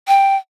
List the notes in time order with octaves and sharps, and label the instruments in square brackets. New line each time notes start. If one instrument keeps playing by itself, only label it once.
[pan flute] G5